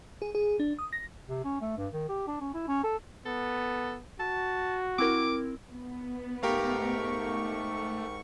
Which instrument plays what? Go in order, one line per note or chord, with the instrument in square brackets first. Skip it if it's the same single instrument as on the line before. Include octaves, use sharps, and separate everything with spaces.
[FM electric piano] G#4
G#4
D4
D#6
A#6
[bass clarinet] C3
C#4
A3
G2
D#3
G4
D4
C#4
E4
C#4
A4
[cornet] B3 [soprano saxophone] A4
[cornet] F#4 [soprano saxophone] A5
[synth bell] C4 E4 A#4 [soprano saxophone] D6
[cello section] B3
[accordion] G#2 C#6 [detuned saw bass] A3 [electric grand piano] G4 A#4 F5